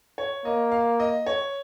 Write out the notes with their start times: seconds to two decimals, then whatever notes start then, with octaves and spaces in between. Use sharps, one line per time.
0.18 C#5
0.45 A#3 D#5
0.72 F5
1.00 D#5
1.27 C#5